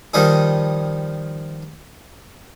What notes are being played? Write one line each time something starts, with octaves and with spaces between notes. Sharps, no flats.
D#3 F3 G3 D#4 G#4